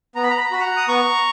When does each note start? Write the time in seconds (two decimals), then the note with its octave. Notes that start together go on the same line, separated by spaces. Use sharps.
0.16 B3 A#5
0.23 B5
0.30 A#5
0.38 B5
0.45 A#5
0.51 F#4 B5
0.60 F#5 A#5
0.77 D#6
0.88 B3 A#5 C#6